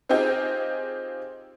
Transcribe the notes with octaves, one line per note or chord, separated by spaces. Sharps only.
C4 D#4 F4 G4 G#4